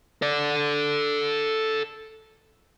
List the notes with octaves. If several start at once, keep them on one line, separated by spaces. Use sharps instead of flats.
A4 D5